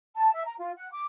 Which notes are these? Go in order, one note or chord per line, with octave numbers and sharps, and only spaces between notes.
A5
E5
A#5
F4
F#5
D6